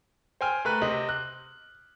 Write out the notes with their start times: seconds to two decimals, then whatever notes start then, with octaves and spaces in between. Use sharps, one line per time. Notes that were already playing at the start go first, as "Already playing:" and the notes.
0.41 C5 G5 G#5 F6
0.65 A3 A#4 B4 F#6
0.81 C3 C4 D#5 F#7
1.09 F#6